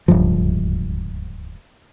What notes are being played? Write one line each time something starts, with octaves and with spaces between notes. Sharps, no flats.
D1 C#2 G2 F3